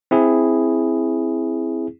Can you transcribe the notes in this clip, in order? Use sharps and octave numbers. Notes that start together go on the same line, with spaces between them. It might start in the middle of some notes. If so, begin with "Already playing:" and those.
C4 E4 G#4